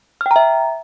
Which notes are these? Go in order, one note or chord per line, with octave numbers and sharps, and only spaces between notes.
E5 G5 A#5 F6